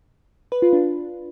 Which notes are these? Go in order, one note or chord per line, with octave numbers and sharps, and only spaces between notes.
B4
F4
D4